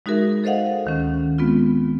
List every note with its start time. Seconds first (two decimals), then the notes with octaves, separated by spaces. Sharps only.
0.06 G#3 D#4 F#4 G#4 A#4 E5
0.44 A4 C5 D#5 F5 F#5
0.85 D2 D#3 C#4
1.38 G#3 B3 C4 F4